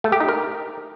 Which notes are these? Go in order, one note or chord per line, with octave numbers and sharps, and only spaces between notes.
A3
G4
D#4
A#4